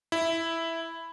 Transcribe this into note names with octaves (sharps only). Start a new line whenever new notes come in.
E4